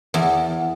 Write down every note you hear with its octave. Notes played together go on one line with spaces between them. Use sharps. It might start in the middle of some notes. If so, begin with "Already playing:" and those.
E2